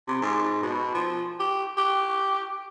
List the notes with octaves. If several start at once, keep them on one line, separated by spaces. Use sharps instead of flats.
C3
G#2
B2
F3
G4
G4